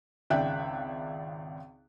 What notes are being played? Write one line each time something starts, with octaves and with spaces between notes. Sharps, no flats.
G#1 C#2 D5 E5 G5 F#6